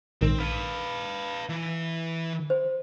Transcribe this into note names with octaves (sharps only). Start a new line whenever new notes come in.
A#1 G#2 D#3 C4
B4 F5
E3
C5